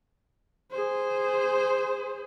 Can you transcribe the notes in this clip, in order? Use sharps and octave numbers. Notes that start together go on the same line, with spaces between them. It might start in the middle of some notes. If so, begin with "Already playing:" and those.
G#4 C5